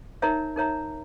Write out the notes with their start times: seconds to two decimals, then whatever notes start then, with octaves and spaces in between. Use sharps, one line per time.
0.22 D#4 A#4 C#5 E5 A#5
0.56 D#4 A#4 C#5 E5 A#5